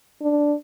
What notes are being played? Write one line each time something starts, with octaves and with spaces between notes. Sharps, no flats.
D4